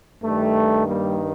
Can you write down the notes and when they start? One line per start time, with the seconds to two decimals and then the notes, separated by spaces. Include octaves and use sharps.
0.23 G2 D#3 G3 A3
0.88 G3 A#3